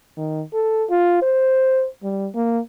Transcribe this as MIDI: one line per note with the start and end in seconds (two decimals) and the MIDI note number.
0.17 0.42 51
0.53 0.84 69
0.90 1.18 65
1.22 1.86 72
2.03 2.28 55
2.35 2.59 58